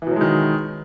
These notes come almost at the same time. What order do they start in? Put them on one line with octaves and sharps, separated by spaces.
E3 B2 F#3 G#3 D#3